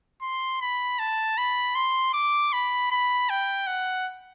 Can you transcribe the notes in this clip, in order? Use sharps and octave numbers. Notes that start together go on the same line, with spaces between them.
C6
B5
A5
B5
C6
D6
B5
B5
G5
F#5